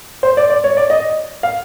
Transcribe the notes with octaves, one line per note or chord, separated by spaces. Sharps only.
C5
D5
D5
C#5
D5
D#5
F5